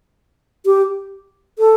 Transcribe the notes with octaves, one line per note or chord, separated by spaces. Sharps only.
G4
A4